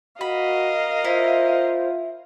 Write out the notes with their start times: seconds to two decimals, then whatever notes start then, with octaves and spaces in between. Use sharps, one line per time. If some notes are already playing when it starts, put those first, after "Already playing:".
0.21 F#4 A#4 D#5 F5 B5
1.04 E4 F4 C5